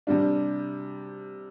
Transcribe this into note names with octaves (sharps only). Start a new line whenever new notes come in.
C3 G3 D4